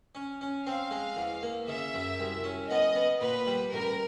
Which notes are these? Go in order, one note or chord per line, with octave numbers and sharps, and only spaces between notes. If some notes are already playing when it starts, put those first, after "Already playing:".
C#4
C#4
C4 F5
G#3
E2
A#3
C#3 E5
F#2
C2
C#4
B3 D#5
B3
A#2 B4
G3
A1 A#4